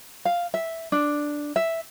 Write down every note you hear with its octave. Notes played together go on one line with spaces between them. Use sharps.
F5
E5
D4
E5